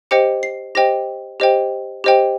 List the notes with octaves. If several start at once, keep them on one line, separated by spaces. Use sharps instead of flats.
G4 C5 D#5 G5 C#7
C7
G4 C5 D#5 G5 A#6
G4 C5 D#5 G5
G4 C5 D#5 G5